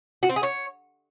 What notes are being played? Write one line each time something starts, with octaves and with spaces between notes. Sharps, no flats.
F#4
C4
G#4
C#5